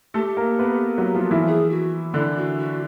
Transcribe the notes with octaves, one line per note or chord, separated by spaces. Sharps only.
A3 G4 A4
A#3 A#4
B3 B4
F#3 F#4
F3 F4
E3 E4
G#4
F#4
D3 D4 E4
F#4
F#4